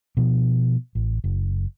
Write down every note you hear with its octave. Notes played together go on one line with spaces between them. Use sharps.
B2 F3
A1
F#1